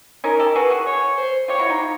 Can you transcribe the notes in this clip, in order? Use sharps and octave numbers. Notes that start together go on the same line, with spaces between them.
C#4 D#4 A#4
G4 A4
F#4 G#4 B4
F#4 G#4
C#5
C5
F4 G4 C#5
E4 F#4
D#4 F4